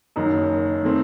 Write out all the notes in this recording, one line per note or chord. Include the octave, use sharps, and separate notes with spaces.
F#1 F#2 D#3
D#3 A3 C4